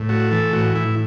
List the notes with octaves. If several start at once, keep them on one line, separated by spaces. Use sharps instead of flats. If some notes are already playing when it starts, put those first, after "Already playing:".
Already playing: A2
A3 F#4
E3 A4
A2 F#4
A2 E4